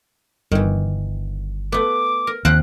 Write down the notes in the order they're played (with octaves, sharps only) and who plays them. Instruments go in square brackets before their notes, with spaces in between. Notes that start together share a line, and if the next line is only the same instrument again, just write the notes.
[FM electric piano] G1 [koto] D#3 E3
[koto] A3 B3 [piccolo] D6
[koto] A#4
[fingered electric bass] D#2 [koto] F3 C4 F#5 [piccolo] F#6